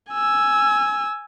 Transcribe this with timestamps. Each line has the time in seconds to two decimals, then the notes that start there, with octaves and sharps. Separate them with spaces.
0.12 G#5 E6